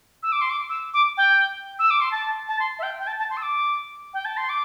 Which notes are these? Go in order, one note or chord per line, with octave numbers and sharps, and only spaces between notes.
E6
D6
C6
D6
E6
D6
G5
E6
D6
C6
A5
A5
C6
E5
G5
G5
A5
A5
C6
E6
D6
G5
A5
C6
D6